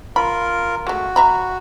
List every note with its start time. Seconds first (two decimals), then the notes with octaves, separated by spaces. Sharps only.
0.16 F4 A#4 B5
0.87 G#3 A3 F#4
1.16 E5 A#5 B5